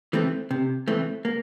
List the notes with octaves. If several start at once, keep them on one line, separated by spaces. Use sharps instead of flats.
E3 A3 C4
C3
E3 A3 C4
A#3